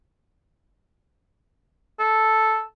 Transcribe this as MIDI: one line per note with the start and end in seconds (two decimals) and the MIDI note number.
1.99 2.62 69